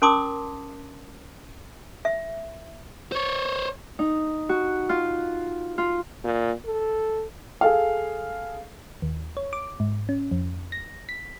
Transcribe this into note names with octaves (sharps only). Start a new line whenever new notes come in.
C#4 A#4 A5 C6 D6 D#6
E5
C5 C#5
D#4
F#4
F4
F4
A#2
A4
G#4 A4 F5
D#2
C#5
D6
G#2
C#4
F2
A#6
B6